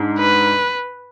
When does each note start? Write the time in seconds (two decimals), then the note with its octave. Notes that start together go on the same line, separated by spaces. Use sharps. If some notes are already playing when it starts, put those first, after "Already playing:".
Already playing: G#2 D4
0.19 B4